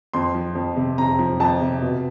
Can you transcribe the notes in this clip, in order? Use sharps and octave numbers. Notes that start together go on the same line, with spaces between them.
F2 C6
F3
F2
C3
F2 A#5
F3
F2 A5
C3
B2